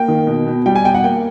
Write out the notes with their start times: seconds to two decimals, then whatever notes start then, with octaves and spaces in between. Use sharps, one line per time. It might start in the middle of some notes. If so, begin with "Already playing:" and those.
Already playing: A#3 G5
0.08 D#3
0.27 B2
0.47 B2
0.66 G3 G5
0.75 G#5
0.85 B2 G5
0.94 F#5
1.04 A#3 G5